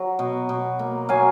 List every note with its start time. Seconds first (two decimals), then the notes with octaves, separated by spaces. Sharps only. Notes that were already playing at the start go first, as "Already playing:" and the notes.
Already playing: F#3
0.19 B2
0.49 B2
0.79 A#3
1.09 F#3 F5 G#5